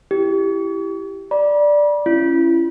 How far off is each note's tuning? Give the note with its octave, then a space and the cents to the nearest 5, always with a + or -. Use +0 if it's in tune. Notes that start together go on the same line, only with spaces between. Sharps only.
E4 +15 G4 +0
D5 +0 B5 -40
C#4 +0 E4 +40